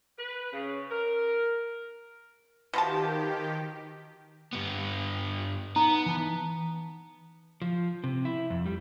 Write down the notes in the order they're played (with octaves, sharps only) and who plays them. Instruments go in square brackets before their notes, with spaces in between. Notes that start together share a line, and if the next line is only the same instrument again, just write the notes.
[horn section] B4
C#3
A#4
[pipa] B2 F3 A5 [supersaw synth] D#3 G4
[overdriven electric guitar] G2 B3
[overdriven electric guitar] B3 [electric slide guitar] D#4 [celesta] A#5
[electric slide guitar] E3 A5
F3
C3
E4
F2
G3